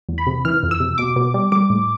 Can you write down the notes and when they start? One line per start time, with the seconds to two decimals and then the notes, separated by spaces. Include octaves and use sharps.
0.09 E2
0.18 B5
0.27 C3
0.45 E3 F6
0.63 F2
0.71 E6
0.80 C3
0.98 B2 D6
1.16 B2
1.34 G3
1.52 G3 D6
1.70 A2